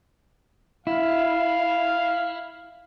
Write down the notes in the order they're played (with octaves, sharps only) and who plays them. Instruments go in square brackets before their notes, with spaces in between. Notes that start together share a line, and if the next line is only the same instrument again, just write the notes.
[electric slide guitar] E4 [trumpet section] F5